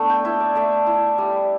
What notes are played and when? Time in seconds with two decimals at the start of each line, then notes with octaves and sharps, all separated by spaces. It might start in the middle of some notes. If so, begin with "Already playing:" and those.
Already playing: A3 B3 D4
0.10 G5
0.25 E4 E5
0.40 D5
0.55 A3 E5
0.87 E4
1.18 G3